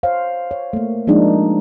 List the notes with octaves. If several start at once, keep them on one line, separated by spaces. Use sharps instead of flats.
C5 C#5 F5
C#5
A3 A#3
F3 G#3 A#3 D4 D#4